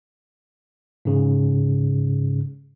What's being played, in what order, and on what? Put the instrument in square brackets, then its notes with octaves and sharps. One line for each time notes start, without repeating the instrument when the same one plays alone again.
[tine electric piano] G#2 C#3